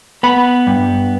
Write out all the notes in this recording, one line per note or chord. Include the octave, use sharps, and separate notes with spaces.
B3 B5
G2